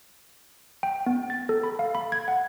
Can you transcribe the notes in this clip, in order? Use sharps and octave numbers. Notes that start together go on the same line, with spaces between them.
G5
B3
A6
A4
B5
F5
B5
G#6
F#5